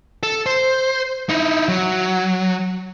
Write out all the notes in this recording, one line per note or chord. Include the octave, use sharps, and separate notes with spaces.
A4
C5
D#4 E4
F#3